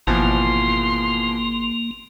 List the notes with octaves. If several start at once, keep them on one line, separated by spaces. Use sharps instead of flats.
G#1 B2 E3 F3 A#3 C6